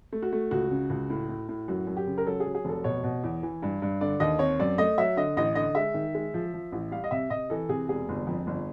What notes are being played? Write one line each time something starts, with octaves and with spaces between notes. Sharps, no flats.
A3
F#4
A3
C#2 F#4
C#3
C#2
A2
A2
A2
F#2 F#4
F#2
G4
C#3
A#4
F#3 A4
G#4
F#3
G#4
F1 A4
B2 C#5
B2
E2
E3
G2
G2
D3 D5
D#2 D#5
C4 C#5
F#2 D5
A3 D#5
F#3 E5
D3 D#5
A1 D#5
D3 D#5
G#3 E5
D#3
G#3
F3
F3
A1
G3 F5
D#5
C3 E5
C3 D#5
E3 A4
C3 G#4
E1 G#4
G1
F2
G1